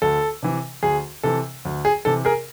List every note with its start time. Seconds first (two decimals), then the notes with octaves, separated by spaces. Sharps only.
0.02 D2 A4
0.43 C3 E3
0.83 D2 G#4
1.23 C3 E3 A4
1.65 D2
1.85 G#4
2.05 C3 E3 A4
2.25 G#4 A#4